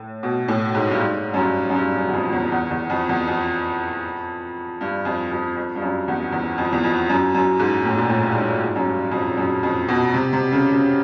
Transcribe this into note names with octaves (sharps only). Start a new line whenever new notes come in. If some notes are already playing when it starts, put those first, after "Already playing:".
Already playing: A2
B2
A2
G#2
G2
G#2
F#2
G2
F#2
G2
F#2
E2
F2
F2
E2
E2
E2
F2
E2
F2
G2
F2
F2
F2
G2
F#2
E2
E2
F2
E2
F2
F#2
F#2
G#2
A2
A#2
A2
G2
G#2
G2
G#2
F#2
G2
F2
F#2
F2
B2
C3
C3
C#3
C#3